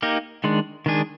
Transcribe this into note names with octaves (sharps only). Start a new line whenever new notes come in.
A#3 D#4 G4 A#4
D#3 G#3 D4
D#3 G#3 D4 G#4